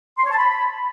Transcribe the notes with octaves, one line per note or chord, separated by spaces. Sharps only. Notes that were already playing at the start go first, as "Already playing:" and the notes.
C6
C#5
A5
B5